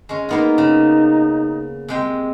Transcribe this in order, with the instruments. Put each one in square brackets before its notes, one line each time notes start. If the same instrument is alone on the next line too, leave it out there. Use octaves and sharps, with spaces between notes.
[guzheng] G#3 C#4
[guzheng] A#3 B3 F4 [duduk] D#4
[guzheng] C#3
C3 G#3 G5